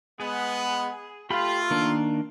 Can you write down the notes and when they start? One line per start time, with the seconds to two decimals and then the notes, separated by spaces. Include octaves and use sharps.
0.20 G#3 B3 G#4
1.30 A3 F4 G4 B5
1.71 D#3 A#3 D4